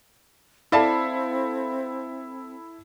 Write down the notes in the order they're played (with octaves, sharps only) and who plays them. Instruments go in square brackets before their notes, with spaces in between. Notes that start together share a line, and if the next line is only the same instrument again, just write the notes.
[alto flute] C4 [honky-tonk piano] E4 A4 [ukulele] D5 F5 A5